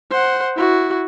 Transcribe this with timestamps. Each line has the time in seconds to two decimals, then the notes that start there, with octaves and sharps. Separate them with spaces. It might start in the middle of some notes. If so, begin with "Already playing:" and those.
0.11 C5 F#5
0.56 E4 F#4